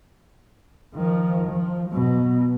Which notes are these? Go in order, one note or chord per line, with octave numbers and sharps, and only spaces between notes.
D#3 F3
F3
B2 F#3